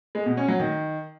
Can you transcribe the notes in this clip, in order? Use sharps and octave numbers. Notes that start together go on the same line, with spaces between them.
G#3
B2
C#4
F#3
D#3